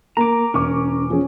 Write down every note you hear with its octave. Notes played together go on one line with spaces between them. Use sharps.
A#3 A#5 D6 D7
E1 C#4 A#4 C#6 D6
F3 C#4 G#4